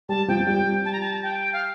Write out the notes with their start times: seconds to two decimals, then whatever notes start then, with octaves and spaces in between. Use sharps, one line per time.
0.09 G3 A5
0.28 F3 G5
0.39 F3
0.47 G3 G5
0.85 A5
0.92 A#5
1.01 A5
1.23 G5
1.53 F5